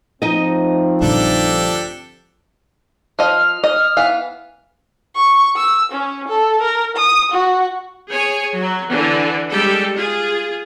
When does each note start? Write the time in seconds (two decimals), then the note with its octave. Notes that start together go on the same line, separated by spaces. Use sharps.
0.22 F3 A3 C4 D#4 D#5
1.02 A#1 G2 D3 D4 G4 A4
3.19 F3 D#5 F6
3.64 D#5
3.97 E3 B3 F5
5.15 C#6
5.57 E6
5.92 C#4
6.28 A4
6.62 A#4
6.97 D#6
7.31 F#4
8.12 G#4 C#5 G#5
8.58 F#3
8.90 D3 E3
9.51 G3 G#3 G4 A4
9.96 F4 G#4